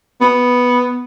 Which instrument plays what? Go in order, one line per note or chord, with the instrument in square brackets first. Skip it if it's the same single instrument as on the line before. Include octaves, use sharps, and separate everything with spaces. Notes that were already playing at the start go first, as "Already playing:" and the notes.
[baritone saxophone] B3